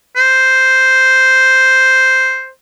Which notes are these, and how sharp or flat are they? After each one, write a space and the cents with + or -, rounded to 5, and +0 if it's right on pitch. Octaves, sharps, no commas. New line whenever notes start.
C5 +0